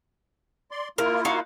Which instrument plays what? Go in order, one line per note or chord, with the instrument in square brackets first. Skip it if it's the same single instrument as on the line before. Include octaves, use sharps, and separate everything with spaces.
[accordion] D5 C6
[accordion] A#3 E4 F4 [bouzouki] A#4
[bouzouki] D#4 F#4 F5